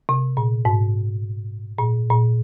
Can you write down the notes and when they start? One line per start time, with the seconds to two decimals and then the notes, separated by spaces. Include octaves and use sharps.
0.09 C3
0.37 A#2
0.65 G#2
1.78 A#2
2.10 A#2